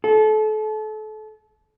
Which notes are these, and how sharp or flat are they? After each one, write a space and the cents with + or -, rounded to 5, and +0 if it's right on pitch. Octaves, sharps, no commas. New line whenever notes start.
A4 -30